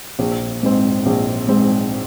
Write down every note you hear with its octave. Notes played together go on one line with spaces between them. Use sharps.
A#1
G#2 G#3 C4
A#1
G#2 G#3 C4